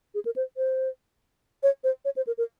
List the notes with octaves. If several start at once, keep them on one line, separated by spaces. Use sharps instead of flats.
G#4
A#4
C5
C5
C#5
C5
C#5
C5
A#4
A#4